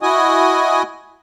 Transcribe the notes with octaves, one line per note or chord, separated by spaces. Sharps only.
E4 F#4 D#5 G#5 D#6